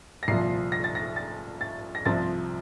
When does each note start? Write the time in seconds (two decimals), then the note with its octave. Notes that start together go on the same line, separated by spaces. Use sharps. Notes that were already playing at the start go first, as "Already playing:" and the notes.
0.23 A#6
0.28 C2 A#2 F3 C7
0.72 A#6
0.84 A6
0.95 A#6
1.16 A6
1.61 A6
1.95 A#6
2.05 C2 C3 F3 C4 A6